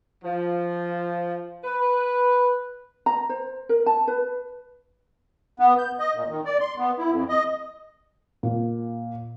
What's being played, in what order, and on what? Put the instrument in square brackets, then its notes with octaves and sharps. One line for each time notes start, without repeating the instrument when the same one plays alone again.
[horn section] F3
B4
[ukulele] A#5
C5
A#4
A5
B4
[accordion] B3
G6
D#5
A#2
D#3
D5
C6
B3
E4
F2
D#5
[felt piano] A#2